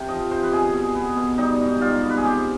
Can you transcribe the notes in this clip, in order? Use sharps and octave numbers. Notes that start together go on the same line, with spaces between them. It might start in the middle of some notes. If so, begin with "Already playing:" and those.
Already playing: C3
F3 D#5
C3 C5
B4
B2 G#4
B2
B3
B2
G3 D#4
G#2
G3 F4
B3
B4
G#4
C4 G4